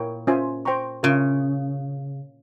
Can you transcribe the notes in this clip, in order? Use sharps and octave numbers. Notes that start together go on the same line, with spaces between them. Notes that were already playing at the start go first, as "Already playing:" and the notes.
Already playing: A#2 E4 A#4 C#5 G5
C#4 F4 C5 E5 G#5
C5 G5 A#5 C#6
C#3 F4 A#4 C#5 E5 A#5